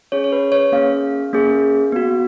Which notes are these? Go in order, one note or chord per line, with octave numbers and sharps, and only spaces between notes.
C#4 G#4 C#5
C#5
B4
C#5
A#3 C#4 G#4 F5
A#3 C#4 G#4
B3 F#4